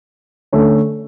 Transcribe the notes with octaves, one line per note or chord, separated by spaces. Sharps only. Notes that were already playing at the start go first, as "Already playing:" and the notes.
D3 A3 C#4